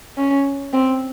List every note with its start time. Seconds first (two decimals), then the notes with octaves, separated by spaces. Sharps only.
0.17 C#4
0.73 C4